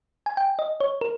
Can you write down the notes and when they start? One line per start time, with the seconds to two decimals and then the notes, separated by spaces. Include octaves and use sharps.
0.26 G#5
0.37 G5
0.59 D#5
0.80 C#5
1.01 A#4